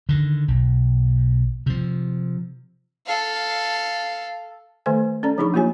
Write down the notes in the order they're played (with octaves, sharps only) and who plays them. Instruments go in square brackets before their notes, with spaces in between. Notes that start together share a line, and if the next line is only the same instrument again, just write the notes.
[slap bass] D3 D#3
B1
C3 F3
[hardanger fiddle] A4 F5
[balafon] D#3 A3 A4 C5 G#5
C#4 A4 D5 A#5
F3 D4 D#4 G#4 B5 C#6
F#3 A#3 F4 G4 C#5 G#5